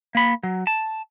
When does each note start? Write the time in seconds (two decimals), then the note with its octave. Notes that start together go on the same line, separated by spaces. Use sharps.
0.15 A#3 B5
0.43 F#3
0.67 A5